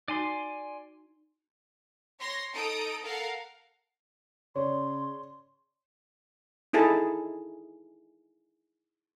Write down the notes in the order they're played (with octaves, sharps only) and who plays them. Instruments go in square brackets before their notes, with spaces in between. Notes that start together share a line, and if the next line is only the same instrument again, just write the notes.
[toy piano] D#4 F#4 [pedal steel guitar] D5 G#5 C6
[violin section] C#5 C6 A#6
D#4 A4 A#5 D#6 D7
A4 A#4 F5 F#5
[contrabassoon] C#3 [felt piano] C#5 D5 [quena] C6
[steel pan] D#4 E4 G#4 A4 A5